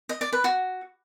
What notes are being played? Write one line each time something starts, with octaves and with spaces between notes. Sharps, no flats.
D#5
D5
B4
F#4